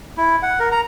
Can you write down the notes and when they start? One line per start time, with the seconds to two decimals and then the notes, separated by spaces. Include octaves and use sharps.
0.18 E4
0.42 F#5
0.59 A#4
0.72 A#5